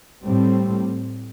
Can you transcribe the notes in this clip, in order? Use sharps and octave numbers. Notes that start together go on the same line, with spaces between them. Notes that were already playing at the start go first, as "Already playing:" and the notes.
A2 G3 C4